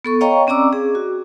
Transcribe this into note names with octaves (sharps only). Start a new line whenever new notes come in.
B3 A4 C#6
C#5 D#5 F5 G5 A#5 C#6
C4 C#4 D5 A#5 D6 E6
G#4
F#4